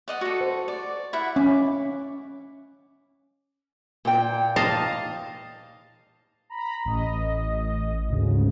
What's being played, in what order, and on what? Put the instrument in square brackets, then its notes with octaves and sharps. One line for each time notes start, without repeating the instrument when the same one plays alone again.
[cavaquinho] D5 D#5 F#5
F#4 A4
[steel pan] C5
[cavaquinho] D5
E4 E5 F#5
[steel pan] C#4 [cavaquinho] D6
[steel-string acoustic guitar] A#2 G5
[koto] D#5 F5 A5
[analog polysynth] A#5 B5
A1 D#5
D2 G#2 C#3